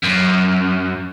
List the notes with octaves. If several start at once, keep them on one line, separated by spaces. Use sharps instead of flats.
F#2